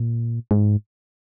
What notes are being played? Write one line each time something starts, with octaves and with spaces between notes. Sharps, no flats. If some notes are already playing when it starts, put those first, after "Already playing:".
Already playing: A#2
G#2